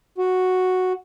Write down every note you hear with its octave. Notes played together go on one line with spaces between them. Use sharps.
F#4